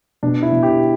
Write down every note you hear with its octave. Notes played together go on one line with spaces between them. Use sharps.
B2 D4
E4
B2
G4